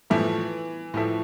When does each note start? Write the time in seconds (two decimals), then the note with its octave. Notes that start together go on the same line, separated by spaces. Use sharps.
0.10 A2 E3 F3 A3 E4
0.94 A2 F3 A3 E4